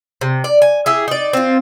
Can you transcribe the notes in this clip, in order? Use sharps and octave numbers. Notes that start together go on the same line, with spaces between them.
C3
D5
G#5
E4 G4 G#4
D#4 D5
C4 F4